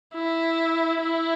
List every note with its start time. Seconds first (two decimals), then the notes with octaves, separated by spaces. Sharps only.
0.14 E4
1.02 E4